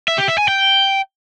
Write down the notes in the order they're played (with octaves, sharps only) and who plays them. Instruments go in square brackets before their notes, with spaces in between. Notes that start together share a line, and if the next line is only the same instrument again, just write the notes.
[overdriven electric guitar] E5
G4
E5
G#5
G5